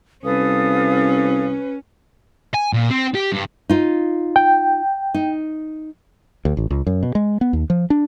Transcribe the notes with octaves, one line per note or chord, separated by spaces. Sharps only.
C2 C#4 A4 B4 F5 D#6
G#5
A#2
C4
G4
G2
D#4 F4
G5
D#4
D2
A1
C#2
F#2
B2
G#3
B3
D#2
F3
D4